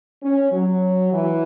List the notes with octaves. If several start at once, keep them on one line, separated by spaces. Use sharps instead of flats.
C#4
F#3
E3